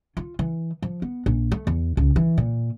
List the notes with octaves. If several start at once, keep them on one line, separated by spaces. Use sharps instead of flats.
F4
E3
F3
B3
A#1
A3
E2
C#2
E3
A#2